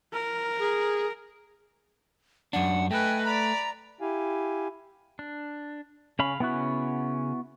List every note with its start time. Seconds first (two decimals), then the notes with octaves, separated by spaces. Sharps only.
0.13 A#4
0.59 G#4
2.53 F#2 D4 F#5
2.90 A3 B4 D#5 G5 G#5
3.25 D5 A#5 B5
4.01 E4 G4 F5 G#5
5.19 D4
6.19 C#3 C#4 F5 B5
6.40 C#3 B3 C#4 E4 F#4